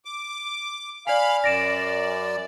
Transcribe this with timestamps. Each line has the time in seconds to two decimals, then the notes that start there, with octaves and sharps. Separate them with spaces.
0.05 D6
1.07 D5 F5 G#5 B5 F6
1.44 F#2 D5 A#6 D7 E7